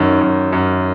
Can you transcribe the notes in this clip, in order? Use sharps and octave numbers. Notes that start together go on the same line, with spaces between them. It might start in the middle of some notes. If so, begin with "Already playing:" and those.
Already playing: F#2 D#3
F#2
F#2